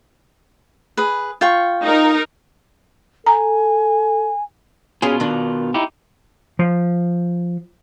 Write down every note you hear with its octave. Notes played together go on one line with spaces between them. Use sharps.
G#4 B4
F4 G5 C#6
D#4 A#4
A4 G#5 A#5
B2 C#4 F4 G#4
D#3 D4
D#4 E4 G4
F3